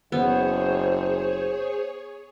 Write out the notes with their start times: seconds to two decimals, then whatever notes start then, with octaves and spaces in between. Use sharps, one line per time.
0.12 F#1 B3 G#4 C5 C#5